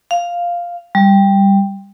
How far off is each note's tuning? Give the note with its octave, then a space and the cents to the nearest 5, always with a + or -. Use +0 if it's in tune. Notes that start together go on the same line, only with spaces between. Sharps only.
F5 +0
G3 +10